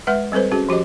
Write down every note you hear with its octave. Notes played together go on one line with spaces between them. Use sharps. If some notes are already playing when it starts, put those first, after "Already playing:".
G#3 B4 E5 F#5
G3 C4 A4 B4 C5
C#4 F#4 G#4
F3 F#4 G4 D#5